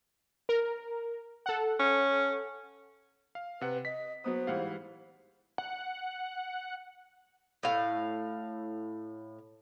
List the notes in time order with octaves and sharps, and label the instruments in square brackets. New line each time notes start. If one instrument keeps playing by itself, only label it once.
[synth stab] A#4
A4 F#5
[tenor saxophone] C#4
[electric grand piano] F5
[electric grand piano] C3 F#5 [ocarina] B4
[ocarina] D#5 [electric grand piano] B6
[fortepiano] F#3 B3 D#6 [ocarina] C5
[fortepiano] G#2 E3 G3 [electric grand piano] F5 F#5
[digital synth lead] F#5
[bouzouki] A2 F5